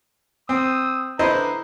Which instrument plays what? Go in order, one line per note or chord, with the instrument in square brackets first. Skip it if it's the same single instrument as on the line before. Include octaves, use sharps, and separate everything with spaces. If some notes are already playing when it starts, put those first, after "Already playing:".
[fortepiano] C4 [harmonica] D#6 E6
[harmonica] D3 B4 A#5 [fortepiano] E4 C5 D#5